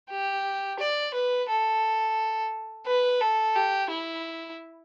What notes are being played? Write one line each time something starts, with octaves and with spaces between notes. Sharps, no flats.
G4
D5
B4
A4
B4
A4
G4
E4